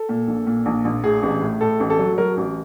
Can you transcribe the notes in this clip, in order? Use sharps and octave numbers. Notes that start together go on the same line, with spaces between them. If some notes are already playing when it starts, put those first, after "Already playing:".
Already playing: A4
A#2
A#1
A#2
A#1
A#1
A2 G#4
A1
A2
A2 A4
A1
A4
F#3
F#3 A#4
A1